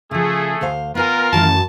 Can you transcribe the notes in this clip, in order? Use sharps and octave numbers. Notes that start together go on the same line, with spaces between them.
C#3 F3 A3 G#4
D2 C5 F5
B3 F4 A#4 B4 G#5
F#2 D#3 E3 A3 A5